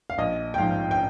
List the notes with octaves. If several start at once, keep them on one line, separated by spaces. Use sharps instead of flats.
F5
A#1 D#5
G5
G#2 F3 F5
G5